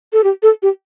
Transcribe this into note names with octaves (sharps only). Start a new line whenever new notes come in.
A4
G4
A4
G4